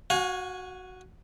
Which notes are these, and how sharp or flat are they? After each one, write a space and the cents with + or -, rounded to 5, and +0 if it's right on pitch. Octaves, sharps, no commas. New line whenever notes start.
F#4 +0 F5 +45 G#5 +0